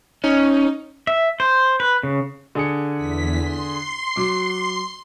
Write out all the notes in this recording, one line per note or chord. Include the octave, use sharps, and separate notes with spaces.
C#4 D#4
E5
C5
B4
C#3
D3 G#4 C#7
E2 B6
C6 C7
F#3 D6